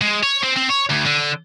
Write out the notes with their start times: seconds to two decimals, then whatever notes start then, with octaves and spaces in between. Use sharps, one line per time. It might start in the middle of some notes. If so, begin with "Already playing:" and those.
0.01 G#3
0.23 C#5
0.43 C4
0.56 C4
0.69 C#5
0.89 D2
1.05 D3